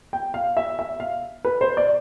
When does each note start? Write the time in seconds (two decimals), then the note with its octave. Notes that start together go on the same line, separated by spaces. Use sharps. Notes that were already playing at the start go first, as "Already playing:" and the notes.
0.13 G5
0.34 F5
0.57 E5
0.79 E5
1.00 F5
1.45 B4
1.61 C5
1.77 D5